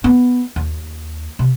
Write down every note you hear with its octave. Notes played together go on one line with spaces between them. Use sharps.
B3
D#2
C3